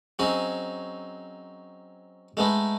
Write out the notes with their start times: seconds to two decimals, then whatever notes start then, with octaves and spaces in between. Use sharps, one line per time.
0.19 F#3 C4 C#4 D#4 G#4
2.37 G#3 A3 B3 D#4